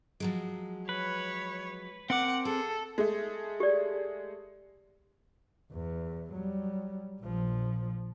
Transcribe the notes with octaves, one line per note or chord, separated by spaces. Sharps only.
F3 F#3 G#3
B4 C#5
C4 A#4 F#5 D6
G#4 A4
G#3 A3
G4 D5
E2
F#3 G3
A#1 F3